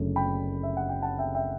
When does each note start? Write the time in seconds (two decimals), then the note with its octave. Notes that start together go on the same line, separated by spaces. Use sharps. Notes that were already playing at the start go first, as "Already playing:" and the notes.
Already playing: F#1 F#2 D3 A3
0.16 G5 B5
0.63 E5
0.77 F#5
0.89 G5
1.02 F#5 A5
1.19 E5 G5
1.35 E5 G5